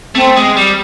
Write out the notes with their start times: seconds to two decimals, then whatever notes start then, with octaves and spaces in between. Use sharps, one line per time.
0.15 A3 C4
0.36 G#3
0.56 G3